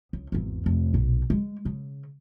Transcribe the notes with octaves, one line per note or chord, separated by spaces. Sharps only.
C#2
G#1 E2
F1
B1 A#2
G#3
C#3